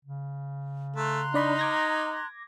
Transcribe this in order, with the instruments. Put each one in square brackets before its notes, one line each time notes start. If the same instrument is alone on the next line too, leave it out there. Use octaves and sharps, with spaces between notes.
[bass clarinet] C#3
[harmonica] A3 [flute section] A#5 C6 F#6
[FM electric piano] D4 D5 B5 [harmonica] D#4
[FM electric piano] D6 G#6 A#6